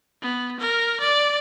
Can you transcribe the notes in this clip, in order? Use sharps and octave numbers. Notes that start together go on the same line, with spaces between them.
B3
A#4
D5